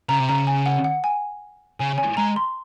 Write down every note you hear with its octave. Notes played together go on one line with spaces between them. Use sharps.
C#3 A#5
C3
C#3 A#5
G#5
F#5
F#5
G#5
C#3 G#5
G#5
G#3 A#5
C6